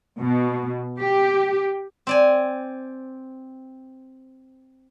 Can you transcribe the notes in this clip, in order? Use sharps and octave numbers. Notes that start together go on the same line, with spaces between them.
B2
G4
C4 D5 G#5